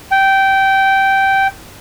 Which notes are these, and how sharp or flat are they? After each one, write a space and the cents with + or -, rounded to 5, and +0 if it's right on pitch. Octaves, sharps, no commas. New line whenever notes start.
G5 -15